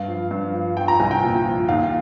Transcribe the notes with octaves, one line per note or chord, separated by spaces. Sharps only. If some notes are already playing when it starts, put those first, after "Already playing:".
Already playing: G2 F5
F3
G2
F3
F3 G5
A#5
C2 G#5
G5
A#2
F3
D#2 F5